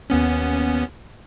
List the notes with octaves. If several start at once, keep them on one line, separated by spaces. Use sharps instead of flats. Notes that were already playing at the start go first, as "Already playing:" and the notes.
D#2 B3 C#4